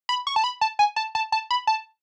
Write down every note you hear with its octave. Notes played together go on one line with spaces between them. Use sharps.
B5
C#6
A5
B5
A5
G#5
A5
A5
A5
B5
A5